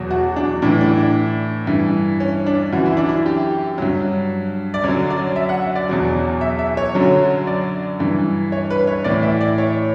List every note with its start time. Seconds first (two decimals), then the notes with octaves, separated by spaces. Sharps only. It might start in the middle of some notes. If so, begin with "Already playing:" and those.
Already playing: E2 B2 F#3
0.11 F#4
0.36 D4
0.62 A2 E3 D4
0.81 D4
0.97 D4
1.67 G2 E3
2.20 C#4
2.46 D4
2.73 F#2 E3 F#4
2.86 E4
2.97 D4
3.09 E4
3.26 G4
3.78 G2 F#3
4.74 D5
4.84 F#2 D3 F#3 C#5
5.10 D5
5.36 E5
5.49 F#5
5.62 E5
5.76 D5
5.89 E2 B2 F#3
6.41 E5
6.59 E5
6.77 C#5
6.95 F#2 D3 F#3
7.47 D5
8.00 G2 E3
8.52 C#5
8.70 B4
8.87 C#5
9.04 A2 E3 D5
9.23 E5
9.41 D5
9.58 C#5